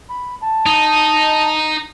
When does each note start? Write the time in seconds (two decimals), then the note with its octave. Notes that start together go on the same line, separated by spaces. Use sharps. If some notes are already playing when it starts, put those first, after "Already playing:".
0.10 B5
0.42 A5
0.66 D#4